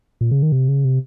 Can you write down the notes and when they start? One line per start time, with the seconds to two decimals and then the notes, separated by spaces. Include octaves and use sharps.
0.21 A#2
0.31 C#3
0.43 D#3
0.52 C3
0.68 C#3
0.85 C3